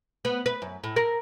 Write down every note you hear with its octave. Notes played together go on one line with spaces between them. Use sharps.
B3
B4
F#2
A2
A#4